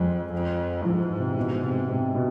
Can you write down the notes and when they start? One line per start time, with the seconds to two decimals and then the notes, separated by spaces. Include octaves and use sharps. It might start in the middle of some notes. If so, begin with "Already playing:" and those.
Already playing: F2 G#3
0.32 F2
0.85 G#2 F3
1.02 E3
1.19 C3
1.36 B2
1.63 C3
1.89 C3
2.15 B2